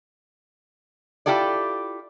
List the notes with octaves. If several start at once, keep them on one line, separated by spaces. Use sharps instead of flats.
E4 F4 G4 A4 D5